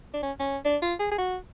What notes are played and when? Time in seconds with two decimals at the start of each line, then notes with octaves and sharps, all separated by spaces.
0.14 D4
0.23 C#4
0.39 C#4
0.65 D4
0.82 F4
0.99 G#4
1.12 G#4
1.18 F#4